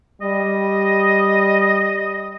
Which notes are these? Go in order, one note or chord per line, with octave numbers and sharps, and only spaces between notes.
G3 D#5